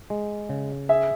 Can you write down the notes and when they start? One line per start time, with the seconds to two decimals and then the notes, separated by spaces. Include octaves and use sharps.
0.10 G#3
0.49 C#3
0.89 G#4 E5